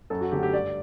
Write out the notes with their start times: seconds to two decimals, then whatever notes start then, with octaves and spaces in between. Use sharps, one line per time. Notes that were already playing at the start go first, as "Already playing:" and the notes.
0.10 F#2 A4
0.21 F#4
0.32 D3 A3 G4
0.43 G4
0.53 G2 D5